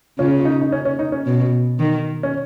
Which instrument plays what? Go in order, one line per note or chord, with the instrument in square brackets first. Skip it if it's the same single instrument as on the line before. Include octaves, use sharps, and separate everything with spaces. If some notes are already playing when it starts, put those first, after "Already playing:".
[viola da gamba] C#3 [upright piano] C#4 F4
[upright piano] F4
D#4
D#4
C#4
C#4
D#4
C#4
[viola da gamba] B2
D#3
[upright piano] C#4